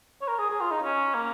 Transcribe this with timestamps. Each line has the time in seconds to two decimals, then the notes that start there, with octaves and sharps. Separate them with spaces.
0.21 C#5
0.28 A#4
0.39 G#4
0.50 G#4
0.61 F4
0.71 D#4
0.83 C#4
1.15 A#3